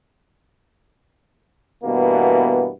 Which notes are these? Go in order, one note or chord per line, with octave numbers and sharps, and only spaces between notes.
G2 B2 E3 A#3 B3